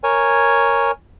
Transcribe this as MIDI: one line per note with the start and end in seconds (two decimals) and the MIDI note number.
0.03 0.91 70
0.03 0.91 73
0.03 0.91 80